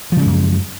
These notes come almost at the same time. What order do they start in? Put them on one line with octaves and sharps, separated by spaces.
F3 C#3 G#3 F#2